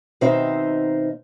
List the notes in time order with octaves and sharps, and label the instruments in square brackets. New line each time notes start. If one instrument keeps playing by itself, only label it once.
[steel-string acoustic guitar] B2 D#3 C4 D#4 C5 E5